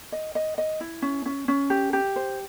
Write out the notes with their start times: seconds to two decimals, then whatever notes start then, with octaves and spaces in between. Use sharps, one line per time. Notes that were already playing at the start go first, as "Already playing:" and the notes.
0.12 D#5
0.35 D#5
0.58 D#5
0.81 E4
1.02 C#4
1.26 C#4
1.48 C#4
1.70 G4
1.93 G4
2.16 C5